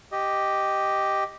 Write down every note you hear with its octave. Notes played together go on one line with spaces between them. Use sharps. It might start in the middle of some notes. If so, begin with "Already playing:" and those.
G4 D#5